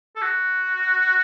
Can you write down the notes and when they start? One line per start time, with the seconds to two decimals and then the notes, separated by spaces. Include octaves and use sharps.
0.16 A4
0.22 F#4